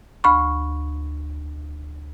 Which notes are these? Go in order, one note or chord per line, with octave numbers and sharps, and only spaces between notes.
D2 B5 C#6